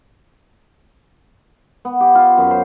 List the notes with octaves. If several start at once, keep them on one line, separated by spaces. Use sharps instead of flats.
B3
G4
F4
F#2
C5